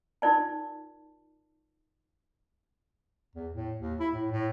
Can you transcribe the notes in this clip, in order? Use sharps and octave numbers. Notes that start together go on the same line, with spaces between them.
D#4 F4 A#4 D5 A5
E2
A2
D#2
E4
A2
A2